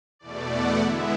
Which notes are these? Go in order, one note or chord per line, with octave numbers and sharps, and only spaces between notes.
E2 B2 A3 D5
F#5
D3 G#3 B3 E4 E5